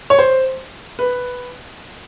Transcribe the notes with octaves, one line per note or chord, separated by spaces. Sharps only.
C#5
C5
B4